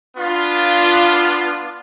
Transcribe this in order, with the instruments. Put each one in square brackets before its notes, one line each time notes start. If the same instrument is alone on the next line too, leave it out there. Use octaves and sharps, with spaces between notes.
[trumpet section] B3 D4 F4